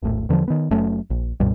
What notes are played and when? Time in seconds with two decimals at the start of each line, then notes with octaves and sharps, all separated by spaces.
0.03 D#1 A#1 A2
0.29 E2 D3 D#3 F3
0.48 D#3 B3
0.70 F#1 F#2 A3 C#4
1.10 A#1
1.40 C#2 G2 B2 G3